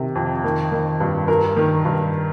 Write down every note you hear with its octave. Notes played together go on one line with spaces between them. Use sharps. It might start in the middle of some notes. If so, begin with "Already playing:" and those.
Already playing: C3 D#3
F2
D#3
D#3
G2
G2 A#4
D#3
G2